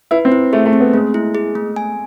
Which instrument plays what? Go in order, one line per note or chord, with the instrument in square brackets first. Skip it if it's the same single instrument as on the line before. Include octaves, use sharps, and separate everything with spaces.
[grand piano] E4 [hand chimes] B4
[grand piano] C4
[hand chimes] E4
[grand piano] A3 [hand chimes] G#4
[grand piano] A3
[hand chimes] C4
[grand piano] B3
[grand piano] G#3 [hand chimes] A3
[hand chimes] E4
G#4
A3
G#5